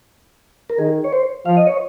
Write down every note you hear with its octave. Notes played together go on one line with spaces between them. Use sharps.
A#4
D#3 G#4
C#5
C5
F3 F5
D#5
C#5